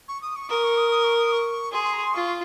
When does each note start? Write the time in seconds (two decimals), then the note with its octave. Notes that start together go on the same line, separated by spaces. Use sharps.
0.08 C#6
0.22 D#6
0.36 C#6
0.49 A#4 D#6
0.63 C#6
0.77 D#6
0.91 D#6
1.04 C#6
1.18 D#6
1.32 C#6
1.72 G#4 C6
1.83 C6
1.93 A#5
2.04 C6
2.13 F4 C#6